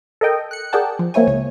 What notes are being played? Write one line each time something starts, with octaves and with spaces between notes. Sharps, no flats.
A4 A#4 D#5 G5
F#6 C#7
G#4 A#4 D5 F#5 G5 A5
F3
A#3 C4 E4 C#5 G#5
C#2 C#5